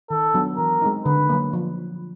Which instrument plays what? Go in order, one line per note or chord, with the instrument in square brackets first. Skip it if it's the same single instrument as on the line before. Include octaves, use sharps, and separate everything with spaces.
[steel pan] D#3 [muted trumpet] A4
[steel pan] F#3 B3 D4 F#4
[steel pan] E3 [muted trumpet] A#4
[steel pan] G#3 C4 D#4
[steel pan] D3 [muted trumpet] B4
[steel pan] F#3 A#3
F3